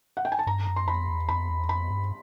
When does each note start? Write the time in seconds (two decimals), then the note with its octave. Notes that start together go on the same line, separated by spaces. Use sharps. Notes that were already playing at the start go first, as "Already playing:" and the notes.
0.17 F#5
0.25 G5
0.32 G#5
0.39 A5
0.47 G2 A#5
0.67 F#2
0.76 C6
0.88 F2 B5
1.08 E2
1.29 F2 B5
1.50 E2
1.69 F2 B5
1.91 G2